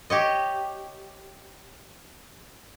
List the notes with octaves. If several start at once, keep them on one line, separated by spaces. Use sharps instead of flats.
G4 C#5 D#5